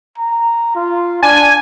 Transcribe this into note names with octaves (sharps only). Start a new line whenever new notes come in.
A#5
F4
D4 G#5